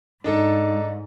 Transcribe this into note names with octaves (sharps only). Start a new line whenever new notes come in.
G#2 D4 D#4 A4